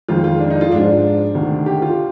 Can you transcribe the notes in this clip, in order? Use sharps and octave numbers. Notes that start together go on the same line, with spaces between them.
F2 D#3 G#3 F4
F4
D4
D#4
F4
G#2 F3 G#3 D4
D2 C3 D#3
G4
F4